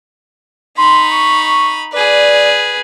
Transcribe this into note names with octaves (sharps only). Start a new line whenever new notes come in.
D#4 B5 C6
C#6
G#4 B4 D5